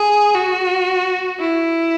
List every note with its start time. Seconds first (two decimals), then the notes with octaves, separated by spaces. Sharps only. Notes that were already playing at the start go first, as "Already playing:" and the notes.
Already playing: G#4
0.35 F#4
1.40 E4